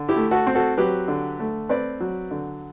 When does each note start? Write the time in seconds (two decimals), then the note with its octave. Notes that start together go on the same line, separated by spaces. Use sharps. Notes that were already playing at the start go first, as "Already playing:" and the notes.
Already playing: D3
0.08 E4 G4
0.16 A3
0.31 F#4 A4
0.47 C4
0.55 F#4 A4
0.77 F#3 G4 B4
1.08 D3
1.39 A3
1.69 C4 B4 D5
2.00 F#3
2.31 D3